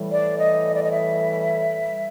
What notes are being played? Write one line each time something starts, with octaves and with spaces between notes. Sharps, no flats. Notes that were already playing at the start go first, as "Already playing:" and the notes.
Already playing: A2 E3 G3
D5
D#5
D5
D#5
E5